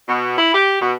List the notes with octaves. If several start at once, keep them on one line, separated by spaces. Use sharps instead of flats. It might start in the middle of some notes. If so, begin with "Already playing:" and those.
B2
E4
G4
B2